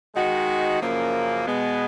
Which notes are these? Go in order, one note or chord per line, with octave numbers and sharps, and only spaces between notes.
D#3 G#3 D#4 F#4
F#2 C#3 F3 A#3
B2 G#3 B3